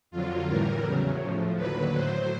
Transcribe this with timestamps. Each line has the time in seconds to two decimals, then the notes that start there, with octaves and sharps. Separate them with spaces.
0.11 F2 D3 F#3 F4
0.48 A2 E3 G3 A#4
0.84 E2 C#3 F#3
1.20 A2 F3
1.57 D#2 D3 F#3 B4
1.93 A2 F#3 C5